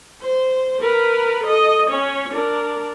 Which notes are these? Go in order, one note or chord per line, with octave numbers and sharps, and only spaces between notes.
C5
A#4 B4
A4 D#5
C#4 C#5
D4 A#4